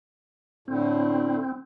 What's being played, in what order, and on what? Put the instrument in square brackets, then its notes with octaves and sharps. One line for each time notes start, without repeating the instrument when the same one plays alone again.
[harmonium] A2 D3 [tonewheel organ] C4